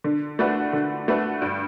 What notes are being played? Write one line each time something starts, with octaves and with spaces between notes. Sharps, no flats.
D3
A3 D4 F#4 B4
D3
A3 D4 F#4 B4
G2